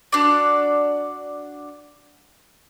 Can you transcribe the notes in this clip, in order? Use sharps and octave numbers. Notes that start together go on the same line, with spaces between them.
D4 F#4 D5